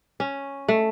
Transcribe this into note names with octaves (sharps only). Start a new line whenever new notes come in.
C#4
A3